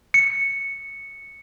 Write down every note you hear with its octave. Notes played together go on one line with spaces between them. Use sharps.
C#7